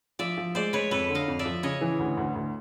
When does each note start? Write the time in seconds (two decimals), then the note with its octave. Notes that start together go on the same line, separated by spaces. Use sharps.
0.19 F3 D5 E5
0.38 F3
0.55 G#3 C5 D5
0.73 G#3 B4 C#5
0.91 F2 A4 B4
1.09 D3
1.15 D#5 F5
1.28 F2
1.39 D5 E5
1.45 F3
1.63 C#3 C#5 D#5
1.81 E3
1.99 D2
2.17 D2
2.35 D2